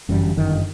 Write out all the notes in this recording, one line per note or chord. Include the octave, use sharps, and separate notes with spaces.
G1 F#2 E3 G3
G1 F#2 D#3